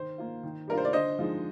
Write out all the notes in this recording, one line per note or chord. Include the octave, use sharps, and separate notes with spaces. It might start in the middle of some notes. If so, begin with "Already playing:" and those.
Already playing: D#3 C5
A#3 F4
D#3
G3 D4 F4 A#4
C5
D5
D3 C5 D#5
F3 G#3 D#4